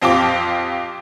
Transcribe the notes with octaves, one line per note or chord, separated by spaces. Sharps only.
F2 C4 F4 G4 D6